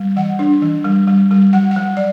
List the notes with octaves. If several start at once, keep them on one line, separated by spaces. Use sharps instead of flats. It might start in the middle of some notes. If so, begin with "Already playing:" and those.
Already playing: G3
E3 F#5
D4
E3
G3
G3
G3
F#3 F#5
F#5
F#3
D5